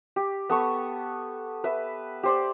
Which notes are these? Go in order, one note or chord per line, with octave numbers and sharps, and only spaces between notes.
G4
B3 A4 C#6
B4 E5
G4 C5 D5